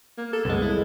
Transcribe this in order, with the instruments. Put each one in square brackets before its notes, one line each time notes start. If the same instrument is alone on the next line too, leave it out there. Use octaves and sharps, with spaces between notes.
[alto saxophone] A#3
A4
[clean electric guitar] C2 F#2 G#3 [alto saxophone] B3
[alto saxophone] E4